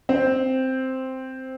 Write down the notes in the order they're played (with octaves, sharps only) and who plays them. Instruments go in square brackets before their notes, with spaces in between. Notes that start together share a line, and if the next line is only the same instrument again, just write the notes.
[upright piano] C4